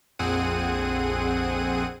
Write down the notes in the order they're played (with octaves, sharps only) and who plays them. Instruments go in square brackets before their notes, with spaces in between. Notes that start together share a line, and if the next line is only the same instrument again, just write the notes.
[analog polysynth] A#1 F2 C4 G#4 F#5 D#7